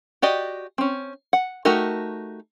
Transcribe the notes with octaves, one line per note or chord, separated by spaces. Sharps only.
F#4 G4 D5 D#5
C4 C#4
F#5
A3 D#4 F#4 G4 A#4